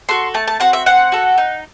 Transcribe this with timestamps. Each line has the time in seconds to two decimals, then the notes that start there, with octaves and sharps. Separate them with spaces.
0.09 F#4 A4 C6
0.34 A3 A5
0.48 A5
0.60 C4 F#4 F#5
0.73 E5
0.86 C4 F#5
1.12 F#4 A4
1.38 D#4